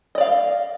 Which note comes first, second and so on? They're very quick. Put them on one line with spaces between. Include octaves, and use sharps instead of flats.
D#5 D5 F5